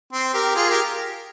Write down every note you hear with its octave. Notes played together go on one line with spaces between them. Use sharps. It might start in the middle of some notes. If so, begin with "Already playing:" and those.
C4
G4 A#4
F4 G#4
G4 A#4